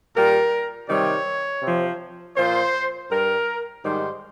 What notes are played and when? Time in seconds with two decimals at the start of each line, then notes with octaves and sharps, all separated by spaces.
0.15 A#2 G3 A#4
0.88 C3 D#3 G3 C#5
1.62 C3 F3
2.36 A#2 F3 C5
3.10 G2 G3 A#4
3.83 G#2 D#3 G3 C5